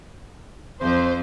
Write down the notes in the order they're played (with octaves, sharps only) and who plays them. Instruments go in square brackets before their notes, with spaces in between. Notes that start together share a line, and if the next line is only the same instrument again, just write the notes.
[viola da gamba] F2 [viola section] C5